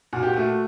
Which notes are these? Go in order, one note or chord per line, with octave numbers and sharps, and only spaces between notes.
A#2 F#4
G4
A3 F#4